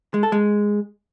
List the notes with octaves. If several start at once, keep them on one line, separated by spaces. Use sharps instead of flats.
G#3
A4
G#3